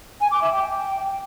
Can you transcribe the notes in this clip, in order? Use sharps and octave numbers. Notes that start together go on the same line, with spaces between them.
G#5
D6
E5
G5